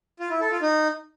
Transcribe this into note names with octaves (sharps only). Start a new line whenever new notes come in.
F4
E4
A4
F4
D#4